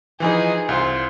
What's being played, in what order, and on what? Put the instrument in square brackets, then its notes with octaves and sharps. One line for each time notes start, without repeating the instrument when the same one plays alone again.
[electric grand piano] E3 F3 D#4 [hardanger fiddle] G#4
[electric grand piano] C2 C5 [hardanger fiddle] F4